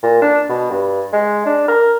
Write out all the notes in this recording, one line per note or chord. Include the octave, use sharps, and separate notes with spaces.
A#2
D4
B2
G2
G#3
D4
A#4